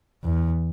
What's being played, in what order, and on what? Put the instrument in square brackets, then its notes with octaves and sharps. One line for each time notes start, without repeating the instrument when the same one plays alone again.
[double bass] E2